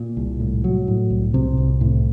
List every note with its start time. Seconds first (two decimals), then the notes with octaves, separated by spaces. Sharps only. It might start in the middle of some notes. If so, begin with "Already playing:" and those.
Already playing: A#2
0.17 C2
0.40 A2
0.64 F#3
0.88 A2
1.10 C2
1.34 C3
1.57 C2
1.81 A2